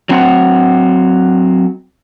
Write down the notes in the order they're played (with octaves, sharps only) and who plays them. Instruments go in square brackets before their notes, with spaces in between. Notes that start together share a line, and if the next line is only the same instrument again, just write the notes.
[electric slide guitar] F#3 C4 F#5